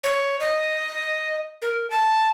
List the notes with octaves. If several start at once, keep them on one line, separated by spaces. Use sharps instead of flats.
C#5
D#5
A#4
A5